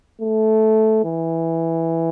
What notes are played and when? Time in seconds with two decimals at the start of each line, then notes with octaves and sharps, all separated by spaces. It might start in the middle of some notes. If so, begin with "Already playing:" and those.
0.22 A3
1.05 E3